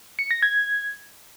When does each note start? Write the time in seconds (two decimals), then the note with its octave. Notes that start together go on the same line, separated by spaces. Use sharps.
0.19 C#7
0.31 A#6
0.42 G#6